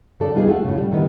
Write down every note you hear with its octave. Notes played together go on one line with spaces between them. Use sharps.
C#3 A4 D5
G3 B3 D#4 F4 F#4 G#4
A3 F4 G4 F#5
A2 C#3
G3
A2 D3 D#3 G3 B3